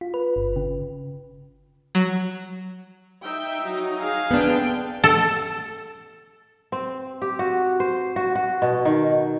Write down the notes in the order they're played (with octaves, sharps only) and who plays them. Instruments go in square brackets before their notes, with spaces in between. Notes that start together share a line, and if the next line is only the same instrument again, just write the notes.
[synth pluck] F4
B4
G1
C#3
F#3
[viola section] D#4 E5 G5
F#3 D#4
[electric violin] G#4 F5
[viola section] D3 G5 [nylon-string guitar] B3 D4
[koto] A4
[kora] C4
G4
F#4
C5
F#4
F#4
B2
D#3